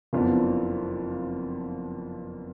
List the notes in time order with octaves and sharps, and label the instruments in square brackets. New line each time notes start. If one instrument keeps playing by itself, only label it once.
[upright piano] F#1 F2 F3 B3 D4